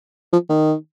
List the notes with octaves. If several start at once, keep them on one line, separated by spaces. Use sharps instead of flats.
F3
D#3